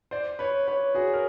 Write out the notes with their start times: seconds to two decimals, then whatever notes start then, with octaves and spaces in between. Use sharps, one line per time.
0.11 C5 D5
0.39 B4 C#5
0.68 B4 C#5
0.94 F#4 G#4
1.13 A#4